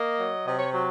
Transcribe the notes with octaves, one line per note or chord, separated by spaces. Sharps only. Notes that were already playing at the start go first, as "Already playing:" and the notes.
Already playing: A#3 D#5
F#3
C3 D#5
C#5
F#3 C5